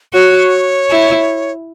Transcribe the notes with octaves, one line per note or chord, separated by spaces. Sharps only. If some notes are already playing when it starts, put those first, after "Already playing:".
F#4 C#5
E4